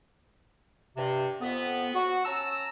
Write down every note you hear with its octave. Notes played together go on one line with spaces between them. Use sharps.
G2 C3
F2 B3
F#4
C#4 A5 A#5 E6